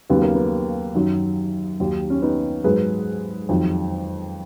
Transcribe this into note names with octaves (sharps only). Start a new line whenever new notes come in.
D#2 C#3 F#3 B3
A#3
B3
F#2 D#3 F#3
D#2 D#3 F#3
C#4
B3 D#4
G#2 F#3 G#4 B4
F2 D#3 F#3